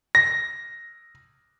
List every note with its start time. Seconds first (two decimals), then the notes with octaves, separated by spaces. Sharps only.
0.15 A#6